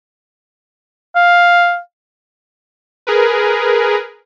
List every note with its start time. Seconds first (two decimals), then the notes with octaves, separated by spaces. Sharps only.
1.16 F5
3.07 G#4 A#4 B4